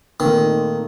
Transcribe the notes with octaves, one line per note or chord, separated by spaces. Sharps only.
A#2 D#3 A3 C4 D#4